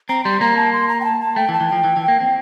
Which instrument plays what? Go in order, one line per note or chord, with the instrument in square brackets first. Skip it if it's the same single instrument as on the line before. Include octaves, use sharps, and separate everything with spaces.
[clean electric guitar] C4 [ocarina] A#5
[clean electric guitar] G3 [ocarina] C6
[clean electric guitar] A#3 [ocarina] A#5
[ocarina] A5
C6
A#5
G5
A5
A5
[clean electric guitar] A3 [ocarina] G5
[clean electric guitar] E3
[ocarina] A5
[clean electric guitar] E3
[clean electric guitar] F3 [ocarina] G5
[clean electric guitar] E3
E3
A#3
C4